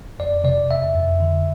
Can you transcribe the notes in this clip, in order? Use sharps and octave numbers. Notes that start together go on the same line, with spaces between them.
F2 D5
C3 D5
F2 E5
F2
D3